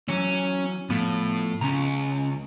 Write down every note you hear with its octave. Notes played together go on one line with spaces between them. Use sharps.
E3 F#3 C#4
A2 F3 B3
C#2 C#4 A#5